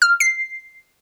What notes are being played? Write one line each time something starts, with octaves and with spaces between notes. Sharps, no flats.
F6
C7